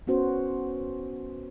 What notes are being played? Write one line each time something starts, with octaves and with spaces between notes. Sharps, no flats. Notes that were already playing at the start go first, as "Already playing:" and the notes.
B3 C#4 F#4 C5